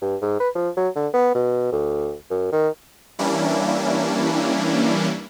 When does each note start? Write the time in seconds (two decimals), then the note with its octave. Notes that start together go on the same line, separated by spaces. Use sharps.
0.02 G2
0.22 G#2
0.40 B4
0.55 F3
0.77 F#3
0.95 D3
1.13 B3
1.35 B2
1.72 D2
2.31 F#2
2.52 D#3
3.19 E3 G3 A#3 C#4 D4 E4